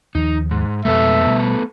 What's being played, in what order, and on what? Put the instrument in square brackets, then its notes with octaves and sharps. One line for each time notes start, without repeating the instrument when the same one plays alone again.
[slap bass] D#2 F3 [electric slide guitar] D#4
[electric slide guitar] G#2
[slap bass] F2 B2 G#3 [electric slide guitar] A3 B3 A4 [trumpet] E5
[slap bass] B2 G3